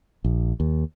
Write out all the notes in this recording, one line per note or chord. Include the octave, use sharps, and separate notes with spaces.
A#1
D#2